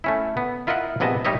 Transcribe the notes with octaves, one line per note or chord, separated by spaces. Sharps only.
A3 C#4 E4
B3
E4 F4 A#4 D#5 E5 F#5
A#1 C3 B3 D#5 G#5 A5
G3 D#4 A#4 C#5 D#5 E5